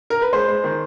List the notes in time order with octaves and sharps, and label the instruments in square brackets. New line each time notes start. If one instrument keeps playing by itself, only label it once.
[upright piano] A#4
B4
G#3 C5
G#3
D#3